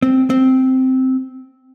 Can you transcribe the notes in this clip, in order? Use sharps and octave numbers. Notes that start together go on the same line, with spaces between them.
C4
C4